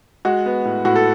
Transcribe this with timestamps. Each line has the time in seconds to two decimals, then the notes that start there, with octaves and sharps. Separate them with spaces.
0.25 G#3 F#4
0.46 B3
0.65 A2
0.85 A2 F#4
0.96 A4